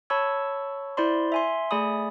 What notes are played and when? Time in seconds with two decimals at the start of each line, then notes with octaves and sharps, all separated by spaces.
0.10 C#5 A5 B5 C#6 E6 G#6
0.97 E4 C5 D5 B5 C6
1.32 E5 G#5 C6
1.71 A3 G#4 D5 G#5 B5 D#6